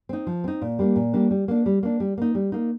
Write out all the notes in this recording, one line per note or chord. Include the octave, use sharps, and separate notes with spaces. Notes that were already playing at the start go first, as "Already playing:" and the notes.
C4 D#4
F3
C4 D#4
A#2
G3 A#3 D4
A#2
G3 A#3 D4
G3
A#3 D4
G3
A#3 D4
G3
A#3 D#4
G3
A#3 D#4